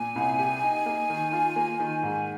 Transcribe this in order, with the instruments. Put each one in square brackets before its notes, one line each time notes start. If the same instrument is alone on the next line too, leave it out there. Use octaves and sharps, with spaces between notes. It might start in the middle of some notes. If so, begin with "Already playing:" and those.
Already playing: [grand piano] A#2 [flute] G#5
[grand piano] C2
G4
D#4
A#3
D#3
F4
A#3
D#3
G#2